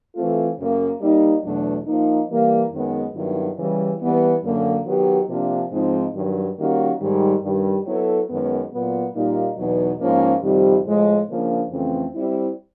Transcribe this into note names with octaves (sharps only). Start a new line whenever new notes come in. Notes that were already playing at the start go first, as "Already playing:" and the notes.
E3 A3 C4 F4 A4
F#2 C#3 F#3 A#3
G3 A#3 D#4
E2 B2 F#3 A3 D4
F3 A#3 D#4
E3 G3 A#3
F#2 D#3 G#3 B3
G2 D#3 F#3 B3 E4
C#3 E3 G3
E3 G3 B3
F#2 D3 F#3 A#3
D#3 F#3 B3 D#4 G4
C3 F3 A#3 D4
G#2 F3 G#3 C4 D#4
G2 D#3 F#3
D#3 G3 A#3 C#4 F#4
G#2 D#3 G3
G2 D#3 G3
F#3 B3 E4 A4
F#2 D#3 G#3 B3
A#2 F#3 B3
A#2 G3 A#3 D#4
E2 B2 F#3 B3 D#4
G#2 F3 A#3 C#4
F2 C3 D#3 G3
A2 F3 G#3
C#3 F3 A#3 D4
F2 C#3 E3 A3 C4
G3 C4 E4